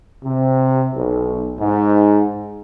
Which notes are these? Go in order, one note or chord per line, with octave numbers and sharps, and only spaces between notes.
C3
B1
G#2